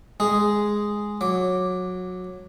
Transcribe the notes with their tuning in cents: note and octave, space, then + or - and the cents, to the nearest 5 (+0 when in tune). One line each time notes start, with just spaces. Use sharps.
G#3 +0 G#4 +0
F#3 -15 D6 +0